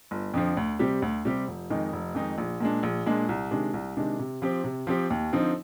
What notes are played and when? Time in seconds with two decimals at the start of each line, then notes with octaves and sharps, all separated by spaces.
0.11 G1
0.34 F2 D3 F3
0.57 D2
0.79 C3 G3 C4 G4
1.02 D2
1.25 C3 G3 C4 G4
1.48 F1
1.70 F2 D#3 G#3 D#4
1.93 F1
2.15 F2 D#3 G#3 D#4
2.38 A#1
2.60 A#2 G#3 D4
2.83 A#1
3.06 A#2 G#3 D4
3.29 C2
3.51 C3 D#3 G#3 D4
3.74 C2
3.97 C3 D#3 G#3 D4
4.19 C3
4.42 F3 C4 G4
4.64 C3
4.87 F3 C4 G4
5.10 D#2
5.33 D3 F3 C4 D#4